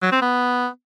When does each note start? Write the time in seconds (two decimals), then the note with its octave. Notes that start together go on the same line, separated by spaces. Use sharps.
0.02 F#3
0.12 C4
0.22 B3